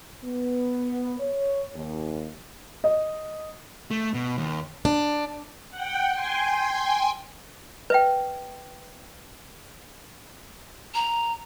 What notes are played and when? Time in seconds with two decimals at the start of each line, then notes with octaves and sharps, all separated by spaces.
0.24 B3
1.20 C#5
1.75 D#2
2.84 D#5
3.91 A3
4.14 B2
4.37 D#2
4.85 D4
5.71 F#5 G5
6.13 G5 G#5 C6
7.90 B4 E5 G5
10.95 A#5